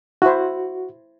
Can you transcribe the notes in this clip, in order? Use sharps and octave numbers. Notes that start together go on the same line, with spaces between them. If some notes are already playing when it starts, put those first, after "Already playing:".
E4 F#4 C5